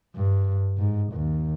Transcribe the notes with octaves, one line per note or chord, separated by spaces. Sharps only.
G2
G#2
D#2